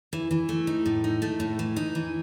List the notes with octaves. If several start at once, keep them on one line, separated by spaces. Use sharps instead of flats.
E3
E3
A3
D#4
A2
D#4
A3
A2
E3
D#4
E3